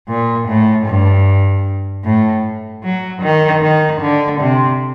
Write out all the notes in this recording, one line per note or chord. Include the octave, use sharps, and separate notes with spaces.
A#2
A2
G2
A2
F#3
D#3
D#3
D3
C3